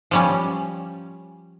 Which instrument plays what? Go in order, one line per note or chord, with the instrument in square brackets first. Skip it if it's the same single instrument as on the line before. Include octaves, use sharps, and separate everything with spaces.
[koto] F3 G3 C#4